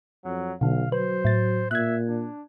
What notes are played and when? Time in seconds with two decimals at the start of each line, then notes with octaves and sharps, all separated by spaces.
0.25 F2 F#3
0.61 B1 B2 D3 F5
0.92 F#3 B4 C5
1.25 A2 A6
1.71 A#2 E5 F#6 G#6
2.07 D4